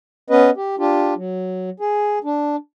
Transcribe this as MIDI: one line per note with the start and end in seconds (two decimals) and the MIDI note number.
0.30 0.50 59
0.30 0.50 61
0.30 0.50 71
0.30 0.50 75
0.56 0.76 67
0.79 1.14 62
0.79 1.14 65
0.79 1.14 67
1.16 1.70 54
1.80 2.19 68
2.24 2.56 62